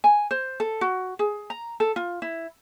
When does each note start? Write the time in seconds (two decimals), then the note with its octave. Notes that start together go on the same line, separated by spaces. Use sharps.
0.04 G#5
0.31 C5
0.60 A4
0.81 F#4
1.19 G#4
1.50 A#5
1.80 A4
1.96 F4
2.22 E4